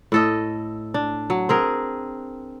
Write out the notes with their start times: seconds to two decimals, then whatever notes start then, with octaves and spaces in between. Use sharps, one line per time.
0.12 A2 A4 D#5
0.94 D4
1.30 F#3
1.49 C4 G#4 A#4